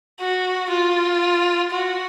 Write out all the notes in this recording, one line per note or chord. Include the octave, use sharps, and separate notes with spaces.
F#4
F4
F#4